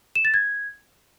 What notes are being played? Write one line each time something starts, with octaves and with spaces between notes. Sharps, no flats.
E7
A6
G#6